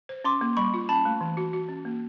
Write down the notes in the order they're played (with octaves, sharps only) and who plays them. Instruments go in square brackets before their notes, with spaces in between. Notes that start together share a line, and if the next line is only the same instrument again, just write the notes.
[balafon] C5
[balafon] C#4 [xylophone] C6 D6
[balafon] A#3
[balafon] G3 [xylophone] B5 C#6
[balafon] F4
[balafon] C#4 [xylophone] A5 B5
[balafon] A3
E3
F#4
F#4
C#4
A#3